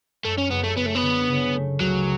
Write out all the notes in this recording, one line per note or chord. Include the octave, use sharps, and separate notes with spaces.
F#2 A3
C#4
F#1 B3
A3
F#1 B3
A3
B3
D3
C#3
A3
C#2 F#3